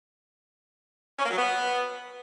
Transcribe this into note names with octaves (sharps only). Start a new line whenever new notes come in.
C#4
A#3
F#3
B3